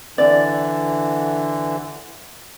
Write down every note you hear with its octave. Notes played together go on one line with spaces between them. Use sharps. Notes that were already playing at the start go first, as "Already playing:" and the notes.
D3 E3 D5